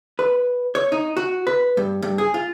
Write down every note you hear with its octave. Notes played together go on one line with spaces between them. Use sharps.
B4
C#5
D#4
F#4
B4
G2
G2
G#4
F4